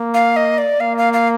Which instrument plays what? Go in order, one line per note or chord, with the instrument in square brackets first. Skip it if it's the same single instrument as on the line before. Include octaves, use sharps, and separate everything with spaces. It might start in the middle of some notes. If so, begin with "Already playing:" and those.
Already playing: [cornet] A#3
[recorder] F5
D#5
D5
[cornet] A#3 [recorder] F5
[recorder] F5
F5